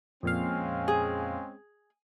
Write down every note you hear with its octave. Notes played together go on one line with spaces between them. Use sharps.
F2 A#2 G#3 C4 C#4 F5
G#4